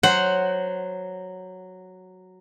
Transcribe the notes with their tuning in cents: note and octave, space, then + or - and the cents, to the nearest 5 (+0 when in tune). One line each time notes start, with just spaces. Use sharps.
F#3 +0 C5 +0 F#5 +10